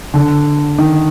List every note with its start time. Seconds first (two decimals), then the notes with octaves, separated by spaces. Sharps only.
0.14 D3
0.78 D#3